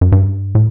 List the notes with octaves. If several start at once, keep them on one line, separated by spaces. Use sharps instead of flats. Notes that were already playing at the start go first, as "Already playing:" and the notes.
F#2
G2
A2